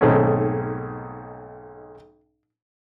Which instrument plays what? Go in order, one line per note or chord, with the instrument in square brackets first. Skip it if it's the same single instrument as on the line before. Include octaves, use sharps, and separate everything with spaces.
[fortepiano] B1 G#2 D#3 A3 C4 C#4